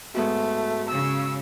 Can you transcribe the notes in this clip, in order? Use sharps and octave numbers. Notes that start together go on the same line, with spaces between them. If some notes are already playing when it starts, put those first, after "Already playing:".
G#2 A3 B3 F#4
C#3 E6